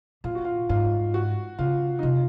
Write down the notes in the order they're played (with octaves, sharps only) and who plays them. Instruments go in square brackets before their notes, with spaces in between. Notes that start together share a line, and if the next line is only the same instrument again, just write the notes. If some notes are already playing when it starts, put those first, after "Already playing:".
[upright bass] A#2 [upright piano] F4
[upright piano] F#4
F4
[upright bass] G#2 [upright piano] F4
[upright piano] F#4
[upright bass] C#3 [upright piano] F4
[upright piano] D#4
[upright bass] C3 [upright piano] F4